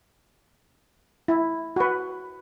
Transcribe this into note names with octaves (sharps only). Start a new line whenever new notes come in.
E4
F#4 B4